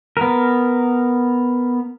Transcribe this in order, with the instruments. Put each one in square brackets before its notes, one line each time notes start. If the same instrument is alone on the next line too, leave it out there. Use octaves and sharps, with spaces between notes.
[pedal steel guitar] B3 A#4